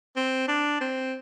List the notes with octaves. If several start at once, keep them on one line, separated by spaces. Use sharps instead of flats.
C4
D4
C4